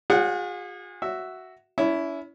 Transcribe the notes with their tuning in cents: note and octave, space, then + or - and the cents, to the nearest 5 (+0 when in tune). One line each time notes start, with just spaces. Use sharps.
F4 +45 G#4 -30 F#5 +10
F#4 +5 E5 +0
C#4 +35 E4 +0